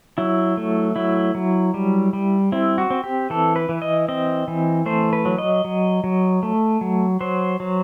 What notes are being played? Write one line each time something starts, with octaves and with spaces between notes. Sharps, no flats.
F#3 E4
A3
F#3 E4
F#3
G3
G3
C4 E4
F#4
C4
G4
E3 A4
B4
E3
D#5
C4 D#5
E3
A3 C5
B4
F#3
D#5
F#3
F#3
A3
F#3
F#3 C5
F#3